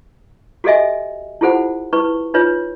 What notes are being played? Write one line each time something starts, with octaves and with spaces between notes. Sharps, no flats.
F#4 G4 A4 D#5 E5 G#5
E4 F4 G4 A4 C5 F#5
E4 B4 C#6
D#4 F4 B4 C#5